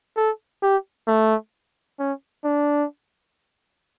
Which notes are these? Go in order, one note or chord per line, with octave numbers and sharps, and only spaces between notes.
A4
G4
A3
C#4
D4